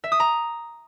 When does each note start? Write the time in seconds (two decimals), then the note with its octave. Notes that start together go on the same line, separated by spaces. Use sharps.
0.04 E5
0.12 D#6
0.20 A#5